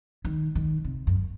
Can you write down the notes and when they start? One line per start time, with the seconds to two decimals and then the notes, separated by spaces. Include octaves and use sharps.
0.25 D#3
0.55 D#3
0.84 C3
1.07 F#2